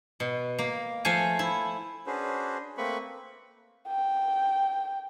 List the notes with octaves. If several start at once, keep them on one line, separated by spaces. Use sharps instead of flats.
B2
A#3
F3 A3 F5 G#5
E4
C#4 D4 F#4 G#4 B4 C5
A3 A#3 C4 B4 B5 C#6
G5